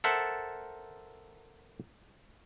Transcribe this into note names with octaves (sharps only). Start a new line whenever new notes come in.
A4 A#4 C5 E5 F#5 A5